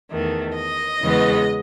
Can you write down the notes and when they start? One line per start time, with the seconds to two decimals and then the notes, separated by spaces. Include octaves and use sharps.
0.11 E2 D#3 A3
0.56 D#5
1.01 E2 C#3 E3 G#3 B3